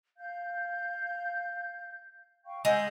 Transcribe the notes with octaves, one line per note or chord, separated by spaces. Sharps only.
F5 G6
F5 G5 C#6
G#3 F#5 E6 G6